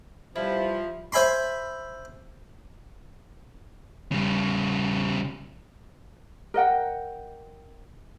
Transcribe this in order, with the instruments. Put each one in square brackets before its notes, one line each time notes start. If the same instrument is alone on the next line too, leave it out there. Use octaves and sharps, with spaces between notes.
[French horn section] C3 E3 G3 [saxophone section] F3 [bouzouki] E4
[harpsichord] C5 E5 G#5 B5 C6
[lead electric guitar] C#3 G3
[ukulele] A#4 D#5 F#5 G5